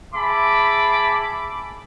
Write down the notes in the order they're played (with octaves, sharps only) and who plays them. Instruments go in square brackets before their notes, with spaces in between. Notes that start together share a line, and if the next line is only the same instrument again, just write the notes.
[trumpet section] G#4 E5 A5 B5 D6